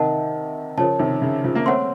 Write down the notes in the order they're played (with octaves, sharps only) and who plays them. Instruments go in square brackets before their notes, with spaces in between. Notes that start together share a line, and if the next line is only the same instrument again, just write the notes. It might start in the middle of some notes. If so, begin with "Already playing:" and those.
Already playing: [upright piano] C3 D#3 [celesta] A#4 D#5 F#5 A5
[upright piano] C#3 F3 [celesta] A#4 C#5 A5
[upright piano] C3 D#3
C#3
C#3 F3
A#3
[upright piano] A3 C4 [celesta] C#5 F#5 C6